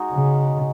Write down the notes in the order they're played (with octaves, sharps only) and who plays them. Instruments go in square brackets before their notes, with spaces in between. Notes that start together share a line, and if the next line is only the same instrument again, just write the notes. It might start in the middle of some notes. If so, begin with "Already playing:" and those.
Already playing: [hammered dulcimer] G#3 D#4 F#4
[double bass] C#3